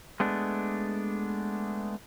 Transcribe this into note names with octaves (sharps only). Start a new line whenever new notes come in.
G#3 A3 B3 D4